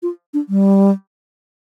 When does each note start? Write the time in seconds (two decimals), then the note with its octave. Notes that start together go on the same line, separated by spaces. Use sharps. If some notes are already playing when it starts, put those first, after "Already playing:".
0.03 F4
0.34 D4
0.49 G3